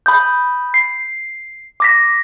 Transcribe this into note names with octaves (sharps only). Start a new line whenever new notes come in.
B5 D#6 G6
C7
D6 A#6 B6